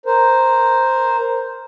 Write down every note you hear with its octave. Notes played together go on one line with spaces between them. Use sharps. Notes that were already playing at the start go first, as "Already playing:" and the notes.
A#4 C5